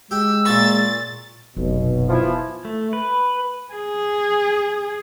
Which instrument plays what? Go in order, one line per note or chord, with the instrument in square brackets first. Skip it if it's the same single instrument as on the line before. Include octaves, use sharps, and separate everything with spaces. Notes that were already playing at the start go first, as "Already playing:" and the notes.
[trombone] G#3 [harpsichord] G4 [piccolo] E6
[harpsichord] A#2 A5 C#6 [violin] A6
[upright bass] F1 F#2 [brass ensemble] B1 B2
[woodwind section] E3 F3 E4
[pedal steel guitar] A3
B4
[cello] G#4